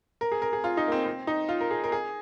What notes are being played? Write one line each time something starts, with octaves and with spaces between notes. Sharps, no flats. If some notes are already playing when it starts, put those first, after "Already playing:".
A#4
G#4
A#4
G#4
F4
D#4
A#3
C4
C4
D#4
F4
A#4
G#4
A#4
G#4